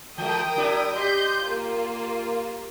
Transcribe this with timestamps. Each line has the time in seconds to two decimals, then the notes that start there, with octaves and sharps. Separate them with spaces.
0.18 E3 G#3 A#4 G5 D#6
0.56 F#3 D4 E4
0.96 G4 D#5 C6 G6
1.44 A#3 F4